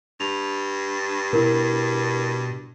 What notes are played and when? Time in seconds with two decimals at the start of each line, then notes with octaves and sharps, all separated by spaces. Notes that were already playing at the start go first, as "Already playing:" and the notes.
0.20 G2 F7
1.33 B2 E4 A#4